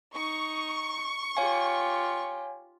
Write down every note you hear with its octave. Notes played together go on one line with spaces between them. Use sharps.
D#4 C#6
F4 G4 C#5 F5 G#5